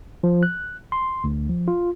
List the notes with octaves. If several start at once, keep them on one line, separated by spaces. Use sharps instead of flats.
F3
F#6
C6
D2
F3
F4